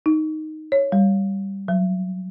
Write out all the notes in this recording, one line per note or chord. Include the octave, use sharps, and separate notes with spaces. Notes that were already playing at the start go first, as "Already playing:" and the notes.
D#4
C#5
G3
F#3